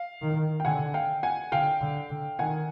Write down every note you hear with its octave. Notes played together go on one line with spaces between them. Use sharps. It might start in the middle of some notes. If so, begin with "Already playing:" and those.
Already playing: F5
D#3
G5
D3 F#5 G#5
F5 G5
F#5 G#5
D3 F5 G5
D3
D3
D#3 F#5 G#5